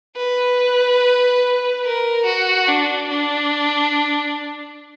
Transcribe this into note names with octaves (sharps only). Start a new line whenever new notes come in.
B4
A#4
F#4
D4
D4